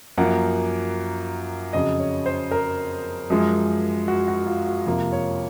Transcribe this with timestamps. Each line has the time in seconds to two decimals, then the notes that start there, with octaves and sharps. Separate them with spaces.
0.18 F#2 F3 A#3 F#5
1.73 F2 C#3 F#3 D#5
1.99 C#5
2.26 C5
2.51 A#4
3.30 F#2 F3 G#3
4.08 F#4
4.28 F#4
4.47 F4
4.66 F#4
4.86 F2 C3 F3 A#3 F4
5.12 C#5